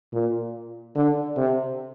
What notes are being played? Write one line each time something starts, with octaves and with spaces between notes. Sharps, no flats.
A#2
D3
C3